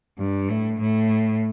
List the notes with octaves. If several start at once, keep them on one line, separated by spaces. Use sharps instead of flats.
G2
A2
A2